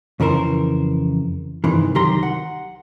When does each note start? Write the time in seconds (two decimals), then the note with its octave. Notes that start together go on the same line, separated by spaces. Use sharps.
0.20 F2 C#3 E3 A#4 C5
1.64 G2 C3 D#3 E3
1.95 C2 D#3 F#3 G4 A#5 C6
2.23 F#5